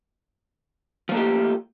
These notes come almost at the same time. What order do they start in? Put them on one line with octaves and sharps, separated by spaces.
F3 A#3 A3 G4